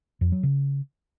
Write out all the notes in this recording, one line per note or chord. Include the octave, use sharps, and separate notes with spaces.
F2
F#3
C#3